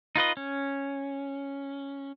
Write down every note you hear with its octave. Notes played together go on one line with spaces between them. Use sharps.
D#4 F4 B4 D#5
C#4